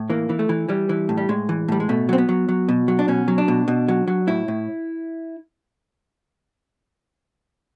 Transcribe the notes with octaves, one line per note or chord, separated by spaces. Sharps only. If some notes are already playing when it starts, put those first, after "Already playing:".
Already playing: A2
E3 A#3
E3
A3
E3
E3 G3
E3
A2
G3
A2 G#3
E3
A2 G3
G#3
B2 A3
F#3 C4
B3
F#3
F#3
B2
F#3
D4
B2 C#4
F#3
D4
B2
B2
F#3
F#3
A2 E4
A2